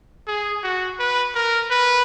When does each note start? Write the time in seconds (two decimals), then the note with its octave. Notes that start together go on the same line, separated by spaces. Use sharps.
0.27 G#4
0.63 F#4
0.99 B4
1.35 A#4
1.71 B4